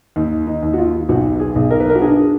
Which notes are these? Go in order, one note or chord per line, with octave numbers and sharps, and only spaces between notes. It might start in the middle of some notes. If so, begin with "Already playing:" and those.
D#2
D#4
D#2
F#4
F4
B1 F#4
G#4
B1
A#4
B4
A#4
F#4
D4 G#4